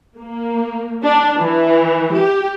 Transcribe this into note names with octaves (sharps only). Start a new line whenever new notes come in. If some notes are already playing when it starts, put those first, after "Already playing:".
A#3
D4
E3
G4